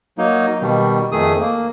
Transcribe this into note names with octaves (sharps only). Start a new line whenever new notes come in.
F#3 A#3 D#4
B2 D#3 G3
F2 D#3 A3 G#4 D#6
A#3